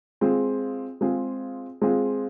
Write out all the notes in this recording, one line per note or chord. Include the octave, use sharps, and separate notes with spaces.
G#3 C4 F4 G#4
G#3 C4 F4 G#4
G#3 C4 F4 G#4